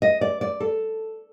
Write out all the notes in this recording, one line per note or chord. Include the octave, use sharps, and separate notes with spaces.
D#5
D5
D5
A4